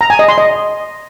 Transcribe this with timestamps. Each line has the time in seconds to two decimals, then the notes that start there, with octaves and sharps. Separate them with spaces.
0.01 A#5
0.10 G#5
0.19 D#5
0.28 C6
0.38 D#5